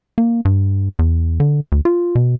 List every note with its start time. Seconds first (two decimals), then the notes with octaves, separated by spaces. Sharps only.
0.18 A#3
0.45 G2
0.99 E2
1.40 D3
1.72 D2
1.85 F4
2.15 B2